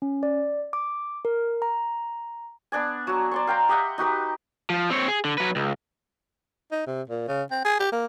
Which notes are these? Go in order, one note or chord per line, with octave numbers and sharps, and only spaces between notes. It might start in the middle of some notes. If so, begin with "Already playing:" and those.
C#4
D5
D6
A#4
A#5
B3 D4 D5 G#5
F#3 F#4
D5 C6 C#6
F5 G5 A#5 C6
G4 D#5 E5 F#5
D#4 F#4 G4 B4
F3
C4 C#5
G#4
D3
F#3 B4
C#2
D#4
C3
A#2
C#3
C4
G#4
G4
A#3